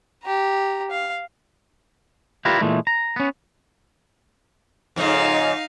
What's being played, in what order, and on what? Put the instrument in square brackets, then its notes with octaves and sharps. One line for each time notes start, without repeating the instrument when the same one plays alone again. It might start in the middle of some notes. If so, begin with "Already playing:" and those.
[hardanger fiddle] G4 A#5
F5
[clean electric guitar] E4 F4 G4 A#4 B4 D5
A#2 E3 G#3 A3
A#5
B3 C#4
[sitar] F2 G#2 C#3 [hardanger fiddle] D#4 F5